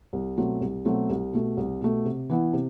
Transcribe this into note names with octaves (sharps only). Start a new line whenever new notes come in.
C2
B2 F#3 A3 C4
C2
B2 F#3 A3 C4
C2
B2 A3
C2
B2 A3
C3
E3 B3 E4
C3